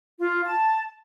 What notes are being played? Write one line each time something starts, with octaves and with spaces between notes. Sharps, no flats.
F4
A5